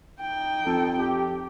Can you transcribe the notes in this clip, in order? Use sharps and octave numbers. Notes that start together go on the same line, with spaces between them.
D#4 G5
F2 A4
G4